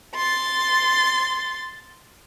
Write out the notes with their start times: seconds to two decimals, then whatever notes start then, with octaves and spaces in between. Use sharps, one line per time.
0.15 C6 A6